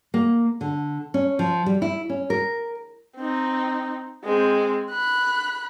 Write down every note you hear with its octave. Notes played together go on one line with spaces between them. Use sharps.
A#3
D3
C#4
F3
G3
E4
C#4
A#4
C4 D#4
G#3 C4
B5 F#6